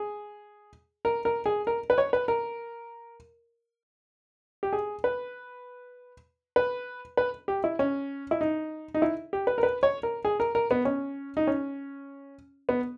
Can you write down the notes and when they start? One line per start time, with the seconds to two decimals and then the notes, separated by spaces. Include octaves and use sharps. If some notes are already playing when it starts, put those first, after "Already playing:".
Already playing: G#4
1.05 A#4
1.25 A#4
1.46 G#4
1.67 A#4
1.90 B4
1.98 C#5
2.13 B4
2.28 A#4
4.63 G4
4.73 G#4
5.04 B4
6.56 B4
7.17 B4
7.48 G4
7.64 E4
7.79 C#4
8.31 E4
8.41 D#4
8.95 D#4
9.02 E4
9.33 G4
9.47 B4
9.58 A#4
9.63 B4
9.83 C#5
10.03 A#4
10.25 G#4
10.40 A#4
10.55 A#4
10.71 B3
10.85 C#4
11.37 D#4
11.47 C#4
12.69 B3